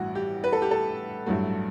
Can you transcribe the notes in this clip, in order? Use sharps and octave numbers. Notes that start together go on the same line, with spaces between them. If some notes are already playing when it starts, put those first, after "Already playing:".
Already playing: A1 G2 E3 F#4
G4
B4
A4
G4
A4
A1 G2 F#3 A3